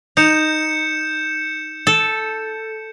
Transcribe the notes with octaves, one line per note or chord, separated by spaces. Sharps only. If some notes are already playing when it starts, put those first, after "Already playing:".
D#4 G6 C#7 E7
A4